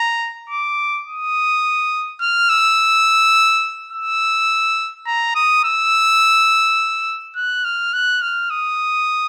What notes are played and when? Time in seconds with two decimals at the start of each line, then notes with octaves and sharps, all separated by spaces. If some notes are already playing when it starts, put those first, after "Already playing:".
Already playing: A#5
0.50 D6
1.06 D#6
2.21 F6
2.49 E6
3.92 E6
5.07 A#5
5.35 D#6
5.65 E6
7.36 F#6
7.65 F6
7.94 F#6
8.22 F6
8.50 D#6